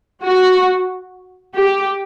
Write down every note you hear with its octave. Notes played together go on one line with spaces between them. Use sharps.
F#4
G4